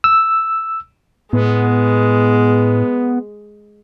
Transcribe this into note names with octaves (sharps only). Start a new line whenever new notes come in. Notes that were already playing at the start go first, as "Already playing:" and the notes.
E6
A2 G#3 B3